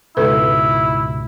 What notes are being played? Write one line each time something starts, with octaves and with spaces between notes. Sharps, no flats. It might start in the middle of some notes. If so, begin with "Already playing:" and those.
C#2 G#2 B2 E4 A4 B4